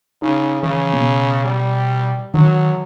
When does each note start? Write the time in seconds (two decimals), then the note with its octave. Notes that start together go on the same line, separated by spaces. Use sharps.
0.22 C#3 D#4
0.63 C#3 E3
0.93 B2
1.44 G3
2.34 D#3 F#3